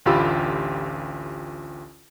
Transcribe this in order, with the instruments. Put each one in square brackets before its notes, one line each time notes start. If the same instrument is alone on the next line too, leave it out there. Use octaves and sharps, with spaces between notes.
[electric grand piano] A1 D2 F4 G4 B5 E6